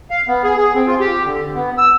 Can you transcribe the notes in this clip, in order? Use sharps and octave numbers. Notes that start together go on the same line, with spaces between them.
F5
B3
G#4
G#4
C4
F4
G4
D3
B3
E6